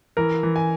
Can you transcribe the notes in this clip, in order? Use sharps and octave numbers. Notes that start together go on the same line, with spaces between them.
E3 A#4
E3
G#5